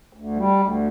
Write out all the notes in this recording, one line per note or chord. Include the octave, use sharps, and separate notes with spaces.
D2
G3
D2